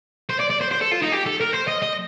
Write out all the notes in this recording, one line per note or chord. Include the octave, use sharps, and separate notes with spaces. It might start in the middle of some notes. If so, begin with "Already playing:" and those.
C5
D5
D5
C5
C5
A4
F4
D#4
G4
A4
A#4
C5
D#5
D#5